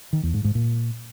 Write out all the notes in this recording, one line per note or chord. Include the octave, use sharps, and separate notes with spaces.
D#3
E2
G#2
G#2
A#2